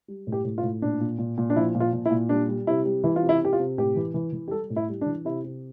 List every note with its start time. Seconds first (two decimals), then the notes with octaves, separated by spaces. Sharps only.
0.08 G3
0.27 A2
0.32 G4
0.44 A2
0.58 F4
0.63 A2
0.82 A#2 D4
1.00 A#2
1.19 A#2
1.38 A#2
1.50 D4
1.56 F3 E4
1.75 A#2
1.80 F4
1.93 A#2
2.06 E4
2.11 A#2
2.29 G3 D4
2.49 G3
2.67 C3 E4
2.85 G3
3.04 E3 E4
3.16 F4
3.23 C3
3.29 E4
3.41 C3 G4
3.53 F4
3.59 C3
3.78 A2 G4
3.96 E3
4.14 E3
4.33 E3
4.48 G4
4.51 G3 A4
4.70 A2
4.76 E4
4.89 G3
5.01 D4
5.06 E3
5.25 C3 E4
5.44 C3